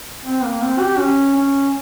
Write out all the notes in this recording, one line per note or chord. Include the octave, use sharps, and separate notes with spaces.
C4
A#3
C4
G4
C#4
C#4